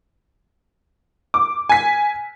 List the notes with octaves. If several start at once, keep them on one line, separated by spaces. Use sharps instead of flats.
D6
G#5 B6